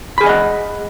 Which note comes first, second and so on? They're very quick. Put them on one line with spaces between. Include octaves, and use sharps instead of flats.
B5 G#4 G#5 D#5 F#5